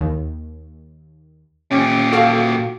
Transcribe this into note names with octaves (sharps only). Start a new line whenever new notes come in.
D#2
A#2 C#4 G4
F#4 A4 F5